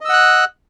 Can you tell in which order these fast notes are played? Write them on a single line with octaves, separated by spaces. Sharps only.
D#5 E6 F#5 F#6